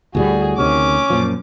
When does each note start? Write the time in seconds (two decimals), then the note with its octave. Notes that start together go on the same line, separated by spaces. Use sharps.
0.15 D2 A2 G3 F#4 G#4
0.58 D2 C3 D#3 C#4 D6
1.10 F#2 A#2 F3